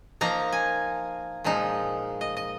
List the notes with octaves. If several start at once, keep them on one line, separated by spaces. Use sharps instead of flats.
F3 A#3 D#4 A#5
G#5
A#2 F3 G#3 D#4
D#5
D#5